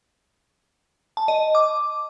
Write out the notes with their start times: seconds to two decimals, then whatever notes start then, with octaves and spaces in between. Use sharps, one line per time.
1.17 A5
1.28 D#5
1.55 D6